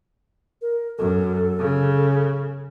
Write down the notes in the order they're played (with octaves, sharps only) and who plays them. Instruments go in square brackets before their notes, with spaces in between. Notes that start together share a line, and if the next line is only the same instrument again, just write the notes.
[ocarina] A#4
[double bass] F#2 [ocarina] A4
[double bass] C#3